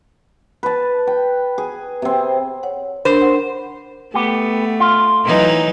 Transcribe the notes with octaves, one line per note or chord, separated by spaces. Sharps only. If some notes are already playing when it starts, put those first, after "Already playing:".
B4 A5
G5
G#4
C3 C4
C#5 F#5
D4 A#4 C5 B5
F#5
A3 B3 G4
F4
E3 F#3 D#4